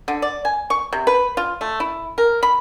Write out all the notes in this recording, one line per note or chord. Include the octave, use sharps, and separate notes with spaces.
D3
D5
G#5
C#6
C3
B4
F4
A3
E4
A#4
B5